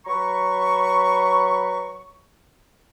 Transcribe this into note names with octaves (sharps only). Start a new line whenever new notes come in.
F#3 B4 A#5 B5 C#6